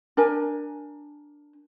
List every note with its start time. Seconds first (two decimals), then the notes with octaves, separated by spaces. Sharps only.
0.17 D4 A#4 G#5